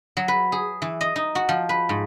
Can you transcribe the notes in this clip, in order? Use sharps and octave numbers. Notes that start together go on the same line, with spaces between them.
F#3
B4
G#4
E3
D#5
D#4
F#4
F3
B4
G#2